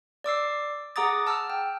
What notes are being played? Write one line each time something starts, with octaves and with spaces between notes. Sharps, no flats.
D5 D6 E6 C7
G#4 F#5 A#5 D6 D#6 A6
A5 E6 F6
G5